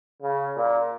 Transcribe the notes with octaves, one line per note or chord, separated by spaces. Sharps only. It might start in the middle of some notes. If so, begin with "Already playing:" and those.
C#3
A#2